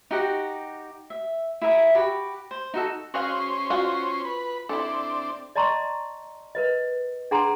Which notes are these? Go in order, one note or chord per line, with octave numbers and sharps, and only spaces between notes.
D#4 F#4 G4 F#5
E5
E4 G#4 A#4 E5
F#4 G4 B5
C5
D#4 F#4 A4
C#4 F#4 G#4 C5 F5
F4 F#4
B4
C4 D4 E4 A4
D5 D#5 A5 A#5 C6 C#6
A#4 B4 D#5
D4 G#4 F#5 G#5 A#5 C6